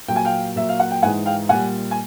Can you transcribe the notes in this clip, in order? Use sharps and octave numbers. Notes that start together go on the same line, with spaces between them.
A#2 F#3 G5
G#5
F5 G5
A#2 F#3 E5
F5
F#5
G5
G#2 E3 G#3 F#5 G#5
F5 G5
A#2 G3 F#5 G#5
G#5